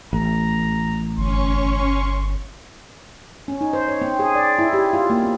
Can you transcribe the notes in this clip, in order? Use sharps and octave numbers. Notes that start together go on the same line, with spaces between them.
A1 A#5
G1 C#4 C6 C#6
C#4
D#4
C5
C#5
C4
G#4
D5
E4
G4
F4
A#3
C4